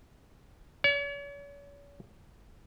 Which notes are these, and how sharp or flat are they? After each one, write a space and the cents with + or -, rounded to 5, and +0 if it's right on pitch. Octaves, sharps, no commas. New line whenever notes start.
C#5 +40